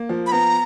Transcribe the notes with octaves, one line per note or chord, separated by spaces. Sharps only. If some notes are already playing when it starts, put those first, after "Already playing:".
Already playing: A#3
F3
B5
B3 A#5